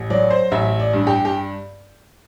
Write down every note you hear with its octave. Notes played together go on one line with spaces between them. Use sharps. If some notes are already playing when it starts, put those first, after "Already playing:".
Already playing: A1
F#3 D5
C5
A1 E5
D5
G2
G4
G4